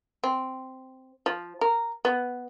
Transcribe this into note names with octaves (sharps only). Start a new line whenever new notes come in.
C4
F3
A#4
B3